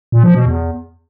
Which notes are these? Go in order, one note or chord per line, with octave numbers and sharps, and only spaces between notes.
A#2
F3
B2
E2